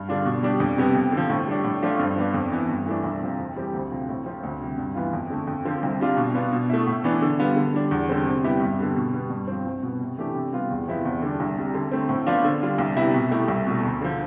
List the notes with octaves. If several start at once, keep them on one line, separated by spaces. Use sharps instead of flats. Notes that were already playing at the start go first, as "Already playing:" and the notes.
Already playing: G2
D3 G3 D4 F4
B2
G3 D4 G4
F2
C3 G3 B3
F2
D3
F3
A2
G3 D4
A2
F3 A3 D4 F4
G2
F3 B3 D4
F2
E3 B3
G2
E3 A3 D4
C2
C3 F3
F2
E3 G3 C4 G4
D2
C3 F3
A2
F3 C4 F4
D2
C3 G3
G2
E3 B3 F4
F2
D3 A3
F2
D3 F3 C4
C2
C3 G3 D4 F4
B2
B3 D4 F4
B2
A3 E4
A2
E3 B3 D4
D3
G3 B3 F4
D3
G3 D4
E2
D3 G3 C4
C3
G3 B3 E4 G4
G2
D3 G3 B3
B2
G3 B3
G2
F3 C4
C2
B2 B3
C3
E3 A3 D4 G4
C3
G3 B3 F4
E2
C3 F3 B3 E4
E2
D3 G3 D4
C2
C3 G3
D3
A3 C4
A2
F3 B3 D4 F4
D3
G3 D4 F4
C2
C3 G3 B3 E4
B2
A3 E4 G4
C2
B2 A3
D2
D3 F3